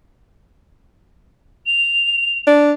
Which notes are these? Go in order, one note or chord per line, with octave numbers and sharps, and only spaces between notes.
F7
D4